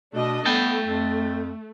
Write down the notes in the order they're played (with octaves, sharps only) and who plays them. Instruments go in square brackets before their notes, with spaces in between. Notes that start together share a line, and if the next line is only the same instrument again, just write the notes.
[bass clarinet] B2 [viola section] A3 D4 D#5
[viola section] A3 [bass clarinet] B3 [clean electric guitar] A4 G5
[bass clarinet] F2